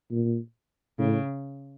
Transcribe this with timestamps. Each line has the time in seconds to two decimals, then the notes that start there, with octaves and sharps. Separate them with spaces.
0.11 A#2
0.99 A2 C#3